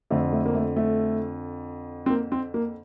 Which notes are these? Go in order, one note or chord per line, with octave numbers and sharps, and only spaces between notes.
F2 D3 A3
A3
A#3
A3
A3
C4
A#3
C4
A#3